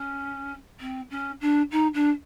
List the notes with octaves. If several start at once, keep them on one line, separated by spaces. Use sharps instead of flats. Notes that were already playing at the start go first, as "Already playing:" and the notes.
Already playing: C#4
C4
C#4
D4
D#4
D4